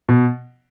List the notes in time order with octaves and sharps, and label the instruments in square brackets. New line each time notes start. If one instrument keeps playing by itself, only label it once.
[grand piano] B2